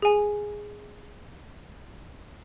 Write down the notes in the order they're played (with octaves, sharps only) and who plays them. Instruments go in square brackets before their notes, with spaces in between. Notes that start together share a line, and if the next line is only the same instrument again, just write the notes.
[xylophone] G#4 G#5